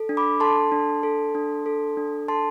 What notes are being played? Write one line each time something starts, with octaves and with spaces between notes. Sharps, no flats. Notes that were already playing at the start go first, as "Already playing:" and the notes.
Already playing: A4
D4
B5 D6
A4 A5 C6
D4
A4
D4
A4
D4
A4 A5 C6